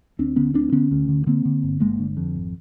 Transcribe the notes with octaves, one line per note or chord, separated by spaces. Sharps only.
D2 C4 D4
D3 B3 C#4
D2 C4 D4
D3 B3 C#4
D2
D3
D3 A#3 C4
D3
G1
G1 G#3 A#3
D3
F2
G#1